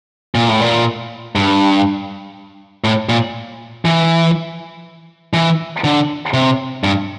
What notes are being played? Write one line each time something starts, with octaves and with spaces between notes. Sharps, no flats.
A#2
A2
A#2
G2
A2
A#2
E3
E3
D3
C3
G2